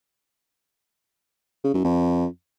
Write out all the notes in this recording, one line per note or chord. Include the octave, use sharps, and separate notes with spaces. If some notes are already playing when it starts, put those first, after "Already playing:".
C#3
F#2
F2